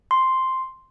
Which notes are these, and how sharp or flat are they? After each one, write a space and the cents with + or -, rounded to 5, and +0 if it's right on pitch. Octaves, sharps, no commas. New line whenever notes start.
C6 +0